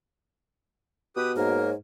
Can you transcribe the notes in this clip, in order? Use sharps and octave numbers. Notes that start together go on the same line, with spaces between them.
B2 G4 B4 D#6
G#2 A#3 A#4 C#5